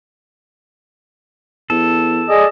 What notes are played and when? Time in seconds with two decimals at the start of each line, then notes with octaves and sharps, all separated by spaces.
1.70 E2 A4
2.29 G#4 D5 D#5